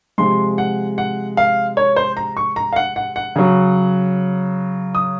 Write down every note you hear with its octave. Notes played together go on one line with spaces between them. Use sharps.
C3 F3 G#3 C6
F#5
F#5
F5
C#5
C5
A#5
C#6
A#5
F5
F#5
F#5
F#5
C#3 F#3
D#6